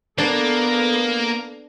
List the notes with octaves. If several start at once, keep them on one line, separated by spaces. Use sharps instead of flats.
A#3 B3 D4 A4